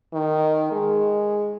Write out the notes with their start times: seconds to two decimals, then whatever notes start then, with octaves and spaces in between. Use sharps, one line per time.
0.13 D#3
0.72 G#3